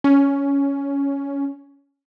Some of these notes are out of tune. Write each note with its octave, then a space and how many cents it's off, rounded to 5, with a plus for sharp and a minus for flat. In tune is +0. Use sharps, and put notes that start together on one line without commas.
C#4 +10